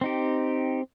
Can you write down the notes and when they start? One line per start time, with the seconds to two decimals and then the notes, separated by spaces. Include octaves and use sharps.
0.01 C4 D#4 G4